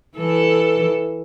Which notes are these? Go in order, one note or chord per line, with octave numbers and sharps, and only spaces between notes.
E3 A4